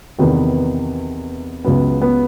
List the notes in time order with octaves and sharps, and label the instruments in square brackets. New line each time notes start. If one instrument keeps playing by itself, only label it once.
[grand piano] E2 C3 D#3 B3
C#2 C#3 F#3 B3
B3